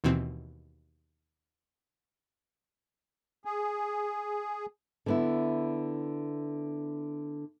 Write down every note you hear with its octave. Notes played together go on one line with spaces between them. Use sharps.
D#2 B2 E3 C4
G#4
D3 B3 E4